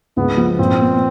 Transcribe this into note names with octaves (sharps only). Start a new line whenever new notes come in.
C#2 B3
F3
A#2 C4
B3